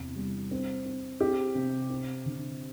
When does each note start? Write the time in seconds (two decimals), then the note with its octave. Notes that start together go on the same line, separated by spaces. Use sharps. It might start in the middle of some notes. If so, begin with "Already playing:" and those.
Already playing: E2 C3
0.16 G3
0.51 C4
0.85 C4
1.21 C4 G4
1.55 C3
1.90 C4
2.26 D3